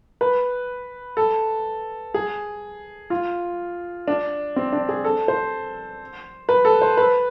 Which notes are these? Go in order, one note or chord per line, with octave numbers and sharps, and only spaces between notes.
B4
A4
G#4
F4
D4
C4
D4
G#4
A4
C5
B4
A4
C5
B4